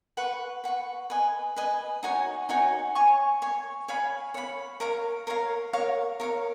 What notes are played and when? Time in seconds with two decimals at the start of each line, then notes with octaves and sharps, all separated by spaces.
0.17 B4 F#5 C#6
0.64 B4 F#5 C#6
1.10 B4 D#5 G#5
1.56 B4 D#5 G#5
2.03 D#4 F#4 C#5 G#5
2.49 D#4 F#4 C#5 G#5
2.95 C#5 G#5 C#6
3.42 C#5 G#5 C#6
3.88 C#5 F5 G#5 B5
4.34 C#5 F5 G#5 B5
4.80 A#4 C#5 F5 A#5
5.27 A#4 C#5 F5 A#5
5.73 A#4 C#5 F5
6.20 A#4 C#5 F5